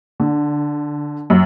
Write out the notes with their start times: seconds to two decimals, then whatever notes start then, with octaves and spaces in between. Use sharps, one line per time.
0.20 D3
1.30 F#2